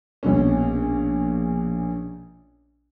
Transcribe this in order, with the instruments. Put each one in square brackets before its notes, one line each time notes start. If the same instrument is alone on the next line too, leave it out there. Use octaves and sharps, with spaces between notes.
[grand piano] A#1 B2 C#4